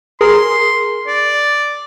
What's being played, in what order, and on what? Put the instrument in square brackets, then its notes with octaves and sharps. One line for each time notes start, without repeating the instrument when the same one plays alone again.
[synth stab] G#4 A#4 [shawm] C6
[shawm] D5